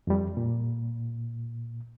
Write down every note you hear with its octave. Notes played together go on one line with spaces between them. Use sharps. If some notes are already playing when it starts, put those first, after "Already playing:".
F2 G3
A#2